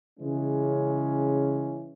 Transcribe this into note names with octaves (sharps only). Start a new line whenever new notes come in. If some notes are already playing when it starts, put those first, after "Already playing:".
C#3 E3 G#3 C#4